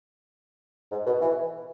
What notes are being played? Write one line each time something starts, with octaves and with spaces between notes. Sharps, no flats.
G#2
B2
E3